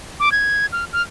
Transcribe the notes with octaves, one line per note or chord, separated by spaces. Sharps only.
D6
G#6
F6
F6